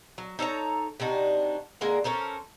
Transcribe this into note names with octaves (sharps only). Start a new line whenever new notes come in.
F#3
D#4 A4 C#5 A#5
C3 D4 D#4 F#4
D3 G#3 A#3 A#4
C#4 A4 A#4 C5